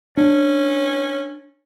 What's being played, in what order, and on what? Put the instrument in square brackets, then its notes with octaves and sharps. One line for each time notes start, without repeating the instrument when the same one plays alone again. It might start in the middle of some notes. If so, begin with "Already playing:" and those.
[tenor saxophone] C#4 [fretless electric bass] D4